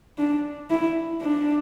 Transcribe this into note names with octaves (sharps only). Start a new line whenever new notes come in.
D4
E4
D4